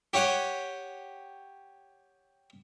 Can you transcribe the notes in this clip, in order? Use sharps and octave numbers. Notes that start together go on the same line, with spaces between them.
G4 C#5 F#5 G#5